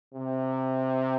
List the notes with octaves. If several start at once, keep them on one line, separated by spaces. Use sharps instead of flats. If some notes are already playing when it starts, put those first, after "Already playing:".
C3